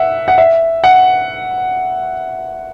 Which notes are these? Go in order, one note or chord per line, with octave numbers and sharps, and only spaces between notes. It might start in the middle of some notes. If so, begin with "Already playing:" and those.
Already playing: E5 F#5
F#5
E5
F#5